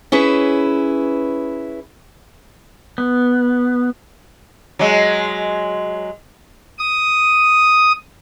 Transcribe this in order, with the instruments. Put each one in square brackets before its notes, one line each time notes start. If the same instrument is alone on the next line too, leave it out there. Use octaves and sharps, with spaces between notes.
[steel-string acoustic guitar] C#4 E4 G#4 B4
[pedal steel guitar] B3
[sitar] F#3 G#3
[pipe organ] D#6